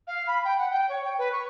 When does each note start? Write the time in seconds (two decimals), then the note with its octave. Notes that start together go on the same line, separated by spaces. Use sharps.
0.07 F5
0.27 B5
0.45 G5
0.59 F#5
0.71 G5
0.89 C#5
1.04 G5
1.18 B4
1.32 C#6